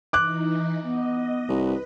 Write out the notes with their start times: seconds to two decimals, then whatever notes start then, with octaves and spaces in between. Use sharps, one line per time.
0.13 E3 D#4 D6 F#6
0.84 B3 D#5
1.49 C2 B4